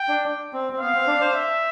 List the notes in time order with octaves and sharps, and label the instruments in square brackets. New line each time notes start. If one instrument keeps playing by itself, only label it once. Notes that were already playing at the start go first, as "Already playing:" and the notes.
Already playing: [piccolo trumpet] G5
[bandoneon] D4
C4
C4
[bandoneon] B3 [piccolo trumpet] F5
[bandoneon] C4
D4
C5
[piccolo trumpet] E5